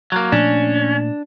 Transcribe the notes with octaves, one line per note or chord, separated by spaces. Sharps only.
F#3 A#3
A#2 F3 A3 C#4 D4